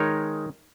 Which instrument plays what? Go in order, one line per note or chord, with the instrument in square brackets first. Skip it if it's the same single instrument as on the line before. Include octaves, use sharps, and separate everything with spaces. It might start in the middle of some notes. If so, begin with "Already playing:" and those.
Already playing: [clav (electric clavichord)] D#3 G#3 D#4 A#4 C#5